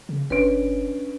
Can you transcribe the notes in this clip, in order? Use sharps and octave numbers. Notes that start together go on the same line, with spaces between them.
C#3
G1 C#4 D4 B4 D7